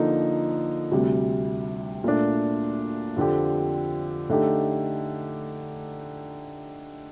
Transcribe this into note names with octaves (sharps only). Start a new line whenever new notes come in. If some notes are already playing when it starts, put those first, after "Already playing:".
Already playing: D3 F3 A#3 D#4
D2 C3 G3
A#2 A3 D4
F2 D3 F3 C4 G4
D3 A3 D#4 G4